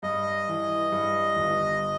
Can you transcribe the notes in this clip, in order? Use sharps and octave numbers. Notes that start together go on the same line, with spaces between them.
G2 D#5
E3
G2
G1